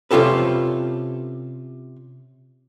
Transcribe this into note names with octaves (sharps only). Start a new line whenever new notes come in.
C3 C#4 F4 G4 A4 B4